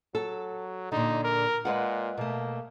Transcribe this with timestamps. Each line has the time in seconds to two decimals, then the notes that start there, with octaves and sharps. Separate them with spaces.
0.15 F#3 A4
0.92 A#2 D3 D#4
1.24 A#4
1.65 A#2 G#3 B4 F#5
2.17 B2 A3 A#3